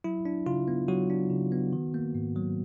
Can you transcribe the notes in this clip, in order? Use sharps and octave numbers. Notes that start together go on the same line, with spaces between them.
F#3 E4
D4
C#3 F4
B3
F#3 F#4
D4
C#3
B3
D#3
A#3
G#2
F#3